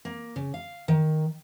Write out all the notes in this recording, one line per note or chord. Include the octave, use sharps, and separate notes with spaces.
A#3
C#3
F5
D#3